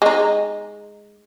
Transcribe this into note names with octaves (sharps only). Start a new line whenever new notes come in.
G#3 D#4